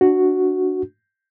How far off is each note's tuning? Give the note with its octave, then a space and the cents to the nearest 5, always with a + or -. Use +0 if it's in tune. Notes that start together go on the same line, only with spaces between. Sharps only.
D4 +0 F#4 +0